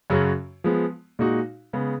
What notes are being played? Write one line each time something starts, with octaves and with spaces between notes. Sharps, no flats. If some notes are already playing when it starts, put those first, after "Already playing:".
F#2 C#3 F#3 C#4 F#4
F3 G#3 B3
A#2 G#3 D#4 F#4
C#3 G#3 B3